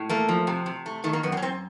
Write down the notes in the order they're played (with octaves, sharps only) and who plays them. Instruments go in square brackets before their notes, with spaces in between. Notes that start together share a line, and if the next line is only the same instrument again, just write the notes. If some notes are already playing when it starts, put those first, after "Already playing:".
Already playing: [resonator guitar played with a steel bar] A2
A3 A#3
F3
C3
C3
A3
D#3 A3
A#3
F#2 B3
C4
C#4
F#2 C4